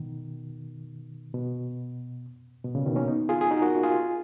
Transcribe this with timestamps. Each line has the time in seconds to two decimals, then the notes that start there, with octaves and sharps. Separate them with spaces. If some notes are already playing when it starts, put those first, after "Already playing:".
Already playing: B2 D#3
1.34 B2
2.64 B2
2.75 A#2 C#3
2.86 B2 D#3
2.96 A#3 C#4
3.07 B3 D#4
3.29 F4 G#4
3.41 G#4
3.51 D#4 F#4
3.62 F#4 A#4
3.83 F4 G#4